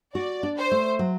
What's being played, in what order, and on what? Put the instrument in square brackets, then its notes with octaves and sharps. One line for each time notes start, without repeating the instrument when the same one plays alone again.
[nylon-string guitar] F#4 [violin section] D5
[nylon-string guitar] D4
[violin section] C5
[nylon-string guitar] A3
F#3